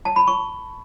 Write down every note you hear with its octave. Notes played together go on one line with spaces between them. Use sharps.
A5
B5
C#6